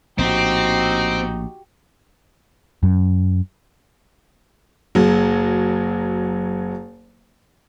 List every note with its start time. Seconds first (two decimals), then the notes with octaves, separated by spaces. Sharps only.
0.19 A#1 A2 C4 D#4 F#4 G4
2.83 F#2
4.95 F#1 F#3